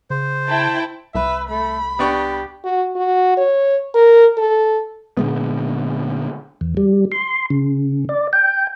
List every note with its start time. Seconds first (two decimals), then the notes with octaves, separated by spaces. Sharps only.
0.10 C#3 C5
0.47 E4 G5 A5
1.15 C2 B4 E5
1.50 A3 B5
1.99 B3 D4 G4 C#6
2.64 F#4
2.96 F#4
3.37 C#5
3.95 A#4
4.37 A4
5.17 A#2 D3 G#3 B3
6.61 E2
6.77 G3
7.12 C6
7.50 C#3
8.09 D5
8.33 G5